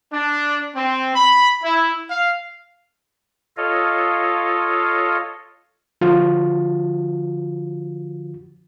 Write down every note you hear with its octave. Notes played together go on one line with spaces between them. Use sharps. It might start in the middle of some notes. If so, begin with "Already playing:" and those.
D4
C4
B5
E4
F5
F4 A4 C#5 D#5 F5
D3 F3 F4 F#4